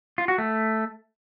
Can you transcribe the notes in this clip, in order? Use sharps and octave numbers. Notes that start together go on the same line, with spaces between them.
F4
F#4
A3